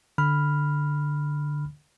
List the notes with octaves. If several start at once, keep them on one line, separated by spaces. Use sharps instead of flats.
D3 B5 F6